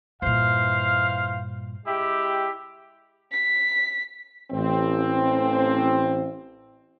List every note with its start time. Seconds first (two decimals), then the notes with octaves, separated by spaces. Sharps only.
0.22 G2 A#2 E3 C5 F5
1.86 G#3 E4 G4
3.32 B6
4.51 A1 C4